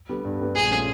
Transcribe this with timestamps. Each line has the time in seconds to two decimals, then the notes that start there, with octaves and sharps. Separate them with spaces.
0.09 D3 G3 B3
0.25 G2
0.40 D3 G3 B3
0.55 A#1 G#4
0.71 F3 A3 C#4